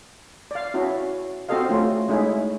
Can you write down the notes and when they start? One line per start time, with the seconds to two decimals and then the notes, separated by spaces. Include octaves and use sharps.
0.51 D5 F5
0.74 C#4 E4 F#4
1.49 C4 F#4 G4 A4 D#5 F5
1.69 A3 C#4 F4
2.08 G#3 A3 C#4 D#4 E4 G#4